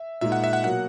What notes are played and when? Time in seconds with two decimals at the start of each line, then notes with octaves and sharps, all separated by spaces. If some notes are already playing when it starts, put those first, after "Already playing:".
Already playing: E5
0.21 A#2 G#3 D#4 E5
0.32 F#5
0.44 E5
0.53 F#5
0.64 B2 F#3 A#3 F#5